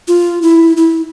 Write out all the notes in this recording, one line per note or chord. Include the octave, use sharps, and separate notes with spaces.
F4
E4
E4